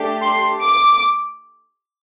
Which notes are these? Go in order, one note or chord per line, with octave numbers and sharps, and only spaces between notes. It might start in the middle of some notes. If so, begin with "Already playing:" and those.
Already playing: A3 D4 G4
C6
D6